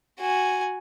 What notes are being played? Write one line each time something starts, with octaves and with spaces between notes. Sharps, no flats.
F#4 G#5